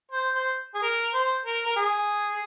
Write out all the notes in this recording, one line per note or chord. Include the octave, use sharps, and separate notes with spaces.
C5
C5
G#4
A#4
C5
A#4
A#4
G#4